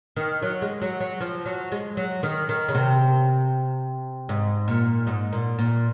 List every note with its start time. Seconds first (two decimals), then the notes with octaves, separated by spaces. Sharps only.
0.16 D#3
0.42 F#3
0.62 G#3
0.82 F#3
1.00 F#3
1.20 F3
1.46 F#3
1.72 G#3
1.97 F#3
2.23 D#3
2.49 D#3
2.68 C#3
2.75 C3
4.29 G#2
4.68 A#2
5.07 G#2
5.32 A#2
5.59 A#2